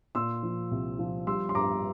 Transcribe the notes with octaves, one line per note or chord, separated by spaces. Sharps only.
A#2 C6 E6
F3
C2
F3
G3 C6 E6
C6
G2 A#5 D6